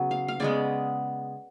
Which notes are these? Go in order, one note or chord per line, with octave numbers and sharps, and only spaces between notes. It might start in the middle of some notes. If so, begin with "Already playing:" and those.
Already playing: C#3 F#3 B3
F5
F5
C#3 G#3 B3 D5